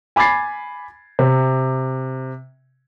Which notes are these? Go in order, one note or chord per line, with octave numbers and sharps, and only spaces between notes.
G#5 B5 D6 G#6 A6 C7
C3